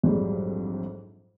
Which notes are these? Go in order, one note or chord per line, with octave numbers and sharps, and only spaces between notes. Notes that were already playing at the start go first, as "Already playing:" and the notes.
A#1 F2 G#2 F#3 G3